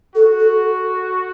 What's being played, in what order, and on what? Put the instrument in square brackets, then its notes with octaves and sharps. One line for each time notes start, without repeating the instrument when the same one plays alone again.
[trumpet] F#4 [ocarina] A4
[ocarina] A4